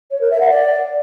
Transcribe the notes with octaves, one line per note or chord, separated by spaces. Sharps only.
C#5
A#4
E5
F#5
D5